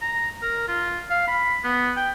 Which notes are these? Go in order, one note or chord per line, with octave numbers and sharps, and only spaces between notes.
A#5
A#4
F4
F5
B5
B3
G5